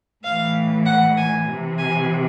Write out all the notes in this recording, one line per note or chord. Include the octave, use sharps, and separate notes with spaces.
A2 E3 F5
F#5
G#5
C3 E3
G#5